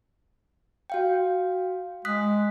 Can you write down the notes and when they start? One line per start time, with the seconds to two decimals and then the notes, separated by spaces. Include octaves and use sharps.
0.90 F#4 F5 G5
2.05 G#3 D#6 F#6 B6